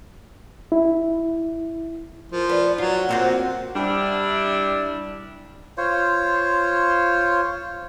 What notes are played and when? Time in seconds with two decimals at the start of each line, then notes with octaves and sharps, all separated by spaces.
0.72 E4
2.32 F3 A#4
2.49 B3 D5
2.78 F#3 F4 B4
2.95 F#5
3.09 A#2 C4 F#4 C5
3.76 G3 D4 E4
5.78 F4 C5 C#5